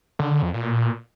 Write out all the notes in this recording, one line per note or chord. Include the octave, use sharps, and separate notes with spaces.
D3
D3
F2
A#2